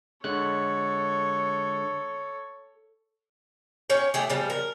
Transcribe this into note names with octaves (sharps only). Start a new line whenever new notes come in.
D3 G#3 A4 C#5 F#6
C#4 C#5 G5
A3 G4 G#4
C#3 F3 G3
A#4